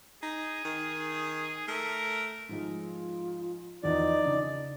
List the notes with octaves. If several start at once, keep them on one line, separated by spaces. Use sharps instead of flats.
D#4 G#4
D#3
A3 A#4
G#2 F3 G#3
F4
E2 F3 D#4 D5
C#3 D4